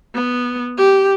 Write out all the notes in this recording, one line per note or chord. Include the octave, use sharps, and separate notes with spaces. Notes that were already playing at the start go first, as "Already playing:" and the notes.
B3
G4